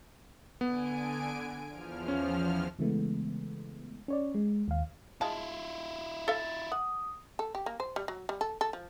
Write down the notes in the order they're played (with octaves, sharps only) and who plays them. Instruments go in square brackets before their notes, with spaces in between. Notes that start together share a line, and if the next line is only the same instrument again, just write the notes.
[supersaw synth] D3 G#5 D7 [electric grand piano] B3
[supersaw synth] E2 F3 F6
[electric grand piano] C#4
[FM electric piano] C#3 E3 G#3 A3 B3
C#4 C#5 D5
G#3
D#2 F5
[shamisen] G#3 F5 A5 [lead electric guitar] E4 F4
[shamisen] A4 E5 F5 [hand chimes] A6
[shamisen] F#5 [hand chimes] D#6
[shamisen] A4
G4
A#3
C5
G3
F#3
G3
A4
A4
F3